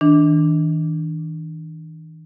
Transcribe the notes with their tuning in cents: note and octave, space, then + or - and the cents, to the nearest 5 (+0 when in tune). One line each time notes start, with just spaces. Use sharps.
D#3 +40 D4 +0